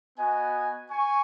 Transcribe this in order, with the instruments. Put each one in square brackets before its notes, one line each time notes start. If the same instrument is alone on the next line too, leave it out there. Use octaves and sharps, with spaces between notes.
[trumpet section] B3 F#4 D#5 G#5
G#5 C#6